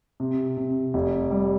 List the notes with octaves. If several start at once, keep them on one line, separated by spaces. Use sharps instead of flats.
C3
C3
F1
G3